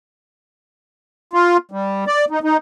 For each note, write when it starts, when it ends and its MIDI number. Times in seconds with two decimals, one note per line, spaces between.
1.33 1.57 65
1.71 2.05 55
2.07 2.25 74
2.30 2.39 63
2.43 2.57 63